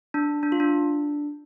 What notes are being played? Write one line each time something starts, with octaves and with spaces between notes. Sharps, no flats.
D4
D4
F4
D4